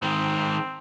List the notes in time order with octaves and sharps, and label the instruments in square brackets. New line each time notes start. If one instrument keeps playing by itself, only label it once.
[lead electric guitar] G#2 D#3 [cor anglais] C4